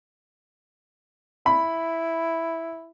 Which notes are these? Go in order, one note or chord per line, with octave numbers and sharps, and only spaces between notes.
E4 B5